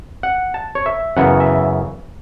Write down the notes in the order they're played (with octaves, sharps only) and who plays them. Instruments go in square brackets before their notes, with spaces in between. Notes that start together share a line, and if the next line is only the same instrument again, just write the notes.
[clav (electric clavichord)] F#5
A5
C#5
E5
F#2 C#3 E3 B3 F#5
E5